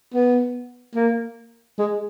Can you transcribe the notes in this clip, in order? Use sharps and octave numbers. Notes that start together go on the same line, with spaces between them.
B3
A#3
G#3